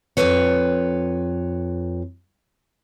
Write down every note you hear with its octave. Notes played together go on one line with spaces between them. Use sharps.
F2 G#2 F4 B4 C#5